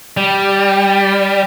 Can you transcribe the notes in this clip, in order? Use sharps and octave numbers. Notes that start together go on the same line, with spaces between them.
G3